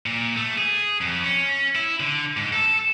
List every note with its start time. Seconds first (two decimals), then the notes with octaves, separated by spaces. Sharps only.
0.06 A#2
0.36 A3
0.58 G#4
1.01 F2
1.24 C#4
1.75 E4
2.00 D3
2.37 G#2
2.52 A4